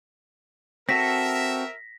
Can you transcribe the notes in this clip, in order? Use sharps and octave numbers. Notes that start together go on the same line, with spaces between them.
C4 F#4 A4 A#4 E5 A#6 B6